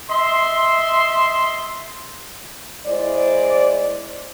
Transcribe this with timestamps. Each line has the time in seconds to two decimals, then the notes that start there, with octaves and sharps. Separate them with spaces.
0.10 D#5 E5 C6
2.87 G#3 E4 C5 D5